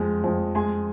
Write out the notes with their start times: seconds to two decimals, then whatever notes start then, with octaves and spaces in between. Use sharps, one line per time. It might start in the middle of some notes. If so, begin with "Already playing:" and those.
Already playing: F2 G#3
0.24 F2
0.55 G#3 G#5 C6